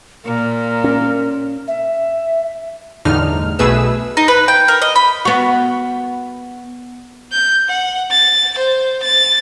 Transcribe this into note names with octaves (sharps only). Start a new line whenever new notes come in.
A#2 A#4
C#4
E5
G1 E2 A2 D3 D#4 F6
B1 B2 A3 G#4 B4 E6
D#4
B4
G5
A#4
D#5
B5
B3 F#4
G6
F#5
A6
C5
A6